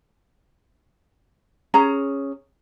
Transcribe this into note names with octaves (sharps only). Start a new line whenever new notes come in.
C#4 G#4 A#5